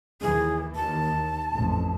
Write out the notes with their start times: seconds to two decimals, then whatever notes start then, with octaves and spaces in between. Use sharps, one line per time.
0.21 D#2 E3 G#4
0.75 D#2 A5
1.53 A1 F2